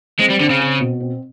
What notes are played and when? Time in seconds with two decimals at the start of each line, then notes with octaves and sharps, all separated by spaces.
0.19 G#3 C4
0.30 G3
0.39 D3 C4
0.50 C#3
0.60 C4
0.81 B2
1.00 C4